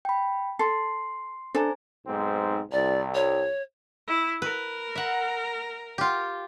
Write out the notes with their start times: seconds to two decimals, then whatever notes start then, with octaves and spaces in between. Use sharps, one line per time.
0.05 G5 B5
0.59 A4 C6 C7
1.55 D4 A4 C5 G#5 A#5
2.06 B1 G#2 C4
2.72 C2 D5
3.14 C#5
4.07 E4
4.42 A#4 B4
4.95 E5 F#5
5.98 F4 G4